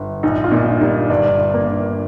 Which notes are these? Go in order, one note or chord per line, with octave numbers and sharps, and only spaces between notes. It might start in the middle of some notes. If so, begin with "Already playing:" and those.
Already playing: G1
A#1 D#4
F4
A#2 D#4
G3 D#4
G1 D4
G1
A#3
G1